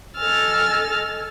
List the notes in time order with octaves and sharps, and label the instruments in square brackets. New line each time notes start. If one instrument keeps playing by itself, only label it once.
[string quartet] A4 D#5 G#5 E6 F6 A6